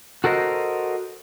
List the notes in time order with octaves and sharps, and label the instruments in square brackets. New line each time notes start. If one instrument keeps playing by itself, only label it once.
[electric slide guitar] F#4 A4 A#4 C5 D#5